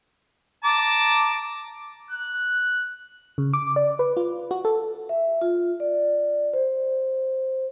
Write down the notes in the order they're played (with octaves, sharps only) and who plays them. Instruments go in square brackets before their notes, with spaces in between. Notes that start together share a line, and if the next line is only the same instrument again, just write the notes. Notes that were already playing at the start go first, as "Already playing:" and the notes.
[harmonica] A5 A#5 D6
[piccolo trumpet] F#6
[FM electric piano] C#3
D6
D5
B4
F4
F#4
A4
[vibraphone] E5
F4
D5
C5